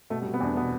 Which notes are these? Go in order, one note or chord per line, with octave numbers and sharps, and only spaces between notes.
B2 A3
G3
B2
B3
E2 D4
B2 B3